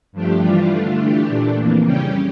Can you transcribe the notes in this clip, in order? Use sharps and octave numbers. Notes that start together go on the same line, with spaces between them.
G2 F3 A3 D4 G4
E3 G3 D4 F4
D3 A3 D4 F4
E3 A3 D4 G4
A#2 A3 D4
F2 E3 A#3
C#3 G3 C#4 G4